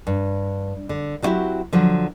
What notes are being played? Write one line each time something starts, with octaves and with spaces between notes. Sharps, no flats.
G2
D3
F#3 G3 C4 E4 F#4 G4
D3 F3 F#3